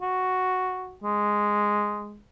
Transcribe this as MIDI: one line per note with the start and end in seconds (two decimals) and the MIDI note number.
0.02 0.96 66
1.04 2.21 56